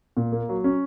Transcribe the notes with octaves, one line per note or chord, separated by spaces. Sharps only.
A#2
A#3
F#3
C#4